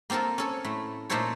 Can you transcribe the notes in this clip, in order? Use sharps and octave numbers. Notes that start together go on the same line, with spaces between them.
A#3 C4 F4 A4 A#4
C#4 A4 C#5
A2 A3
A#2 A3 D#4 A4 C5 C#5